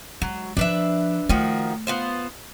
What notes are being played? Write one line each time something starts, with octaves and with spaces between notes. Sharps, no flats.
F#3 G#3
F3 D4 B4 E5
D#3 F3 A3 F#4
B3 F4 C5